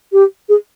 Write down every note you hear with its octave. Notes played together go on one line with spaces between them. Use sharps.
G4
G#4